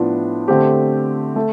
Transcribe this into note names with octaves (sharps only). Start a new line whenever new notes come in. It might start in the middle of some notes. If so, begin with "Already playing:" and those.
Already playing: A2 F3 B3 D4 F4
D3 A3 C4 G4
A3